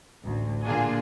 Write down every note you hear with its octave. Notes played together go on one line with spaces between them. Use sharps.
A1 D2
A#2 D3 A#3 D4 F4 G#4